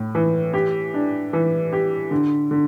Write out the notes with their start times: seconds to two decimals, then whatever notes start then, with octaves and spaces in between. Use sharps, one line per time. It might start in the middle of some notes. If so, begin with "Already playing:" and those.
Already playing: A2
0.15 E3
0.54 G4
0.94 D4
1.33 E3
1.73 G4
2.11 D3
2.51 D3